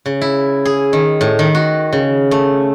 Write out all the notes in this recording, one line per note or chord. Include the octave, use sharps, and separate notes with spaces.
C#3
E4
G#4
D#3
A2
D#3
F#4
C#3
A3